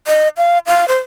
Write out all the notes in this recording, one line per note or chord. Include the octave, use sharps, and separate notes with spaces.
D#5
F5
F5
C5